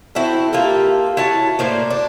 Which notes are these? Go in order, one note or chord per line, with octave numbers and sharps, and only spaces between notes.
C4 E4 F#4 A4
A#3 F4 G4 A4
E4 F#4 C#5 A5
A2 A#3 C5 D5
D4